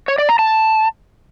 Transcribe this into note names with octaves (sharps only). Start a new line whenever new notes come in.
C#5
D5
A#5
A5